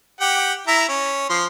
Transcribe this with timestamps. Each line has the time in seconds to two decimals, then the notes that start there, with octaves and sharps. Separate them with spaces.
0.20 G4 F#5 G5
0.67 E4 E5 A#5
0.89 C#4
1.29 F3 C6